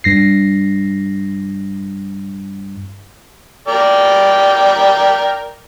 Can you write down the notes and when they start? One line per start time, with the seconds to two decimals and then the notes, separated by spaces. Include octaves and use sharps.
0.04 G2 A#6 C7
3.68 A#4 D5 G5